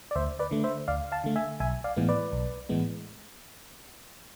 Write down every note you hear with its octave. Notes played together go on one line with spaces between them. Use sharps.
D5
D2 C5 E5
B4 D5
D3 A3
C5 E5
D2 D5 F5
F5 A5
D3 A3
E5 G#5
B1 E5 G#5
D5 F5
A2 E3 G#3 B3
B4 D5
B1
A2 E3 G#3 B3